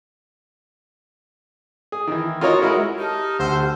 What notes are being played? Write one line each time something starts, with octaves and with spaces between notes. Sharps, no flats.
G#4
D#3 E3
F4 F#4 A#4 C#5 D#5
G#3 E4 F#4 A#4
D#4 G4 A5 F6
D2 C5 F#5 E6